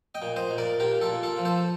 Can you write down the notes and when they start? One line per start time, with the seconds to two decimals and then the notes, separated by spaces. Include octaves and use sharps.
0.15 D#5 G5
0.22 A#2
0.36 C5 D#5
0.51 A#2
0.58 A#4 D5
0.80 A#2 G4 A#4
1.01 F4 A4
1.09 A#2
1.23 F4 A4
1.38 F3
1.45 A4 C5